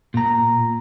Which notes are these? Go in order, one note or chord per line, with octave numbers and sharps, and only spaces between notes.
A#2 A#5